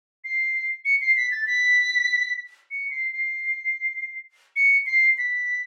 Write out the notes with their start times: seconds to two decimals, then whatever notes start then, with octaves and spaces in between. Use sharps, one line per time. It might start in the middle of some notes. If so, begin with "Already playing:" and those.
0.24 C7
0.85 C#7
1.01 C7
1.17 B6
1.31 A6
1.47 B6
2.71 C#7
2.91 C7
3.12 C7
4.56 C#7
4.86 C7
5.18 B6